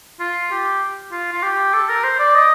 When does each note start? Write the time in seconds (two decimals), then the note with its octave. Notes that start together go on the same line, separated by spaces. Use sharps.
0.20 F4
0.51 G4
1.12 F4
1.32 F4
1.43 G4
1.74 A4
1.89 A#4
2.04 C5
2.19 D5
2.35 D#5